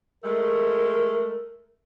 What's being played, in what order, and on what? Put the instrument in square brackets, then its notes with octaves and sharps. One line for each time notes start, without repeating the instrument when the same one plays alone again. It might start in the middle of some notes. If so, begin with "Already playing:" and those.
[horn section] G#3 A3 [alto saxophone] A#4